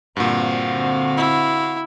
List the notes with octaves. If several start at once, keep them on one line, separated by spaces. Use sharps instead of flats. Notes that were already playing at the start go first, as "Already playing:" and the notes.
G2 A#2 D3 C4 F#4 F5
E4